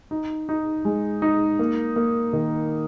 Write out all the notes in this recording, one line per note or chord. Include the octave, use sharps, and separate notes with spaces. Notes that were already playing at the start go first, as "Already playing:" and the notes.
D#4
D#4
G#3
D#4
A#3
A#3
D#3